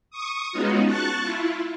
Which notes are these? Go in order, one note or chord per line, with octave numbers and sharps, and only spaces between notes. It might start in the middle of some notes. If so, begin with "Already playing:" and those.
C#6 D#6
G#3 B3 C#4 D#4 F4 F#4
A5 C#6 F#6 A6
E4 F4